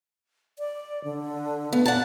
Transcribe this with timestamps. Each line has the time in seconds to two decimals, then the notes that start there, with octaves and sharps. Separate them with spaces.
0.59 D5
1.04 D3
1.73 A3 B3
1.86 D5 F#5 A5